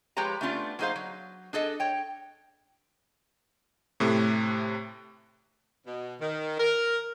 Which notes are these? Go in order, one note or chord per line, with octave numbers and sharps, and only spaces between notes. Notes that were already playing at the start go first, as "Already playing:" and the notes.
F3 G#3 G4 B4 C#5 A#5
A3 B3 C#4 D4 F4
F#3 A#3 D#4 G#4 C5 F5
F#3
D4 G#4 A4 D#5
C#5 G5
A2 C3 A3
B2
D#3
A#4